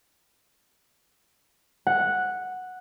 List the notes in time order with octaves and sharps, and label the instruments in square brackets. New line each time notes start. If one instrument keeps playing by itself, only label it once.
[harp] F#5